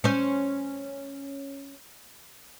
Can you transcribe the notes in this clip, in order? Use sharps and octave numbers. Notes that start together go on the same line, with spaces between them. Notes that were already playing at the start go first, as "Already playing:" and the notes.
C#4 C5